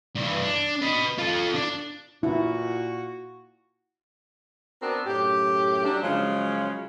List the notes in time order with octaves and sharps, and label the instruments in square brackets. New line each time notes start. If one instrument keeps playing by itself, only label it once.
[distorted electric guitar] G2 E3
D4
B4 D#5
F4 A4
D4
[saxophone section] A#2 F#4 [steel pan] E4
[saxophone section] B3 C4 D4 F#4 A#4
F#2 A2 G4
F#3 G3 D4
C#3 F3 F#3 G#3